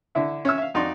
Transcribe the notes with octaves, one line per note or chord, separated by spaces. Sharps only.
D3 E4 E5
C#4 E5 E6
E5 F5
F2 D#4 F#4 D5 C6